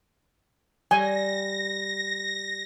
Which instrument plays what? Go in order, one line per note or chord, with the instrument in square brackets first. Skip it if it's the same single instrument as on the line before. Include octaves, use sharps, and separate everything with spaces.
[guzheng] G3 [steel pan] G#5 [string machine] A#6